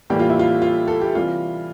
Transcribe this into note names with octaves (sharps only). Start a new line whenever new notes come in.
A2 E3 G3 A#3 G4
F4
E4
F4
F4
A4
G4
C3 E3 G3 F4